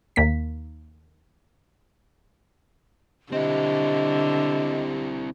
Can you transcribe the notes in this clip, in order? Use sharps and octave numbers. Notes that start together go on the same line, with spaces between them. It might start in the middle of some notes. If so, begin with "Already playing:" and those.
D#2 A#3 B6
D3 C4 E4 G4 D#5